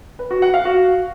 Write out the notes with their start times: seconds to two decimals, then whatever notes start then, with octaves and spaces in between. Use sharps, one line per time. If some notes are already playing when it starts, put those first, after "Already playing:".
0.19 B4
0.31 F#4
0.42 F#5
0.54 F5
0.65 F#4